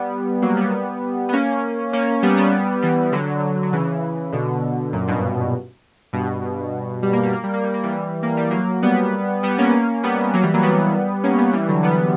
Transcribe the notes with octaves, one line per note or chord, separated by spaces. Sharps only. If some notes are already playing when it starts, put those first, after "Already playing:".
Already playing: G3 B3
F#3 A#3
G3 B3
B3
A#3 C#4
A#3 C#4
G3 B3
G3 B3
E3 G3
D3 F#3
F#3
C#3 E3
B2 D3
F#2 A#2
G2 B2
G2 B2
G3
A#3
G3
A#3
G3
A#3
G3
A#3
E3 G3
A#3
G3
F#3 A#3
G3 B3
G3 B3
A#3 C#4
G3 B3
F#3 A#3
E3 G3
F#3 A#3
G3 B3
A#3 C#4
G3 B3
E3 G3
D3 F#3
G3 B3